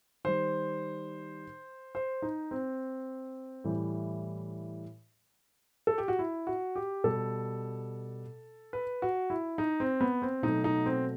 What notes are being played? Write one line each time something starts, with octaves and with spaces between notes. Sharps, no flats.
D#3 G3 C5
C5
D#4
C4
A2 E3 G3
A4
G4
F#4
E4
F#4
G4
B2 G3 A4
B4
F#4
E4
D#4
C4
B3
C4
B2 F#3 A3 D#4
D#4
C4